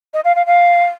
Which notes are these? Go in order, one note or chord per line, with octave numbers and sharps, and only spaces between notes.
D#5
F5
F5
F5